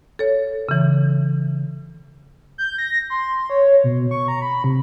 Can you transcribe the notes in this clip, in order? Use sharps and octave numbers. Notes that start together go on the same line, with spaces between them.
A4 C#5
C#3 E3
G6
A#6
C6
C#5
B2
C#6
A#5
B5
C3